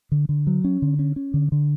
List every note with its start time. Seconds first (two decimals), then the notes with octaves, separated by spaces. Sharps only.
0.12 D3
0.29 D3
0.47 F#3
0.64 C#4
0.82 D3
0.99 C#4
1.16 C#4
1.34 D3
1.52 D3